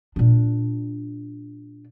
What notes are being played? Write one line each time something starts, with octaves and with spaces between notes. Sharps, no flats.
A#2 D4